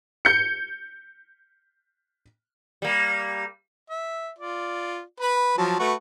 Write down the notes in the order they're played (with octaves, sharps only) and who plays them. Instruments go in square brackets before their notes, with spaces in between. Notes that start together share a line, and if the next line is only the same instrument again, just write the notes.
[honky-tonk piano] G6 C#7
[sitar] G3 A#3
[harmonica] E5
F4 D5
B4 B5
F3 F#3 A5
A3 F#4 B4